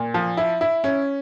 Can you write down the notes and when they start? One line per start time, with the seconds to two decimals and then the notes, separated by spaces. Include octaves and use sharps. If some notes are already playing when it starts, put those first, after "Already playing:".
Already playing: A#2
0.14 F3
0.37 E4
0.61 E4
0.84 C#4